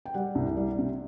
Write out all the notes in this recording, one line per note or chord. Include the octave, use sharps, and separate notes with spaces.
G5
G3 F#5
C2
G3
C3